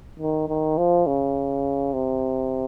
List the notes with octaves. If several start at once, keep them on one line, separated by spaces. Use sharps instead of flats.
D#3
D#3
F3
C#3
C3